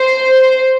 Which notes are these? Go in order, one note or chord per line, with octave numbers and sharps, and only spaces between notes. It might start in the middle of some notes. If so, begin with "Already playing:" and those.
Already playing: C5